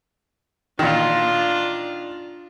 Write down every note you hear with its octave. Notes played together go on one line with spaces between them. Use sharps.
A#2 D#3 D4 F4